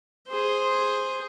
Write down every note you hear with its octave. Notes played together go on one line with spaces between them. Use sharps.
G#4 C5